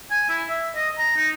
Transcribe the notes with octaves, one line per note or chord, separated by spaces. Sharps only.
G#5
E4
E5
D#5
A#5
D#4